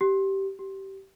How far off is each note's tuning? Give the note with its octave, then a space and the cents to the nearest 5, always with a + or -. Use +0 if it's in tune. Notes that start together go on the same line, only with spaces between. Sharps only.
G4 -15
G4 -20